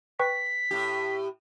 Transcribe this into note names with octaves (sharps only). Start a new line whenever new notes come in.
B4 G5 C#6 B6
A2 G4